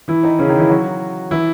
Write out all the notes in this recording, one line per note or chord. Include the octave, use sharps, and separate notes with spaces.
E3 E4
D#3 D#4
C#3 C#4
D#3 D#4
E3 E4
F#3 F#4
E3 E4